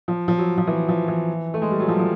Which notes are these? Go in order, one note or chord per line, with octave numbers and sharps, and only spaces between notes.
F3
F3
F#3
F3
E3
F3
E3
A3
G#3
G3
F#3
F3
F3